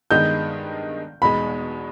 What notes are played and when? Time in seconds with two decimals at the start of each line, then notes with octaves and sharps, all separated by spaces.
0.11 G2 D#3 G#3 B3 D#4 G6
1.22 E2 B2 G#3 D#4 B5